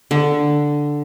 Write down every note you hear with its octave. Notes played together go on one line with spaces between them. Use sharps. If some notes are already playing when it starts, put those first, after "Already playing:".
D3